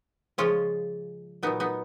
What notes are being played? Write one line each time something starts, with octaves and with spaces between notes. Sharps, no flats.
C#3 F3 G#3 C#4 F4
A#2 F#3 B3 D#4
B3 D#4